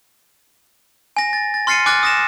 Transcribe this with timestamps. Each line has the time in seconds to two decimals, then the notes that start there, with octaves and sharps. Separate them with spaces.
1.17 G#5 A#6
1.33 A6
1.54 A6
1.67 C6 F6 A6 C7 C#7 D#7
1.86 G#5 D6 F6 F#6 A6
2.03 D#6 A#6 E7